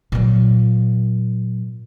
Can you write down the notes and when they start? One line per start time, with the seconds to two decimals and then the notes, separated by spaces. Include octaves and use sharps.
0.12 A#2 F#3